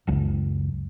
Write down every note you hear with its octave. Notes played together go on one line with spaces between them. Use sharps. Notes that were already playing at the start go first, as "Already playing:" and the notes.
F#1 C#2